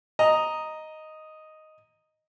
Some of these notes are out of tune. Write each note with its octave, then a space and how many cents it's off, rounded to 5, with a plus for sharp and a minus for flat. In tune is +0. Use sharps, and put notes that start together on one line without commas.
D#5 +0 A#5 +0